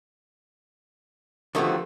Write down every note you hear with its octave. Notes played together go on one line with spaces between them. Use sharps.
D3 D#3 F3 A3 B3 E4 F#4 G4